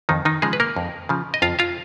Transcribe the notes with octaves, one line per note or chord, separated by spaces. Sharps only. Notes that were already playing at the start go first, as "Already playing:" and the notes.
F2 D#3 D#4
D#3 D#4
C#3 F3 G#3 G#4
B4
A#3 A#4
F2
C#3 F3
D#5
F2 F4 F5
F4 F5